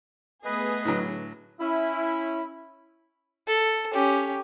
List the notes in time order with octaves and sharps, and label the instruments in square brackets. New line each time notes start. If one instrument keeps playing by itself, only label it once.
[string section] A3 B3 G#4 [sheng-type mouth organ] B4 D#5
[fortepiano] A2 D3 F#3
[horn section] C#4 E4
[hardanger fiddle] A4
C#4 G4